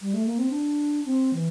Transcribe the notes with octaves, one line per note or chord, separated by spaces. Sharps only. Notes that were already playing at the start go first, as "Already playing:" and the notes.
G3
A3
A#3
C4
D4
C4
E3